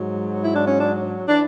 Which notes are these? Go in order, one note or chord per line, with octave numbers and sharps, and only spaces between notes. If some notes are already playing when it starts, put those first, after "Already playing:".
Already playing: G#2 F#3
E4
D4
C#4
D4
E3 D4